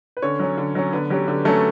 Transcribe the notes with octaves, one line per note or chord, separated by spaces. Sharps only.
B4
D3 C#4 C#5
F#3 C#4
D3
F#3 C#4
D3 B3 B4
F#3 C#4 G4
D3 G4
F#3 A3 C#4 A4